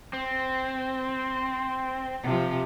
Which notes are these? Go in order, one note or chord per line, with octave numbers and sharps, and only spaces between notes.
C4
C3 F3